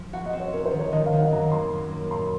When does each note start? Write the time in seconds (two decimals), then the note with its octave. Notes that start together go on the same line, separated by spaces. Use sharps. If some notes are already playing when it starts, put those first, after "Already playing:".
Already playing: F3
0.13 F#4 F#5
0.26 D#5
0.33 C4
0.40 C#5
0.53 C#4 A#4
0.66 C5
0.72 D#3
0.79 C#5
0.92 D#3 D#5
1.06 F5
1.13 D#3
1.19 F#5
1.32 F#2 A#5
1.52 A#3 C6
1.72 F#2
1.91 A#3
2.11 A#2 C6